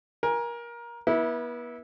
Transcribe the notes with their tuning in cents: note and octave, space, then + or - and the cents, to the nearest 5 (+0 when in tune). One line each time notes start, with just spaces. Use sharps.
A#4 +20 G#5 -10
B3 -35 E4 -15